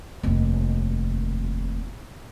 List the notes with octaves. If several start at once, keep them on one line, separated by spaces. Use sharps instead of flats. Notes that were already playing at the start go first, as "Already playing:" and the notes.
F1 D#2